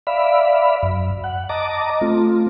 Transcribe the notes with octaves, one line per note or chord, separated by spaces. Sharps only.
D5 E5 F5 B5
F#2
F#5
D#5 A5 A#5 D6
A3 C4 F4